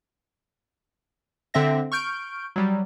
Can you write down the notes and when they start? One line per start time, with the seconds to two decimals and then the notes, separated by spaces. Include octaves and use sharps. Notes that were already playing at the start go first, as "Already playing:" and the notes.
1.54 D3 C4 E5 A#6
1.92 C#6 F6 G6 D7
2.56 F#3 G3